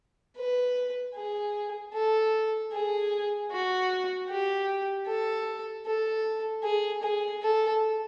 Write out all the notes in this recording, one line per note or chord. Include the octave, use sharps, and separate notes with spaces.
B4
G#4
A4
G#4
F#4
G4
A4
A4
G#4
G#4
A4